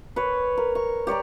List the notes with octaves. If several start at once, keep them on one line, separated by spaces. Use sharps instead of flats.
B4 C#5
A#4
C#6
G4 C#5 D5 A#5